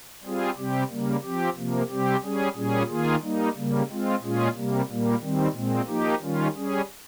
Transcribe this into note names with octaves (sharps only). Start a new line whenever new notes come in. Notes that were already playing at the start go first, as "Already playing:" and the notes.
G3 C4 F4 G#4
C3 G3 C4 G4
C#3 G3 A#3
F3 C4 G4
C3 F3 A#3
C3 G3 C4 G4
G3 C#4 G#4
A#2 G3 C#4 G#4
D#3 A#3 F4 G#4
G3 A#3 D#4
C#3 G3 A#3
G#3 C4 F4
A#2 G#3 C#4 F4 G#4
C3 G3 A#3
A#2 G3 A#3
D#3 G3 C4
A#2 G#3 C4
F3 A#3 D#4 G4
D#3 G3 C#4 F4
G3 C#4 G#4